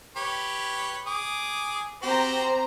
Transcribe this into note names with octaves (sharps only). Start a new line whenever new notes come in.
G4 B4 C#5
G#4 D6 D#6
C4 F#4 G4 C5 A#5